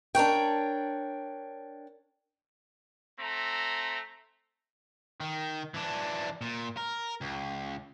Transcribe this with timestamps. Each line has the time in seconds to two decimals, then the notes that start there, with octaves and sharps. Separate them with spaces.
0.15 D4 A#4 C#5 G5
3.20 A3 C4 A#5
5.21 D#3
5.74 E3 D4
6.41 A#2
6.77 A#4
7.21 C#2